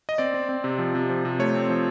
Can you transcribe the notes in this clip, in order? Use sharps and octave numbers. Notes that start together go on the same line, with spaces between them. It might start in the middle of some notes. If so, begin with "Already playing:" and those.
D#5
C4 D5
C4
C4
C3
F3
C3
F3
C3
A3 C#5
C4
F3